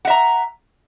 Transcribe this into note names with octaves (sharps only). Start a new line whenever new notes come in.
E5 F#5 A#5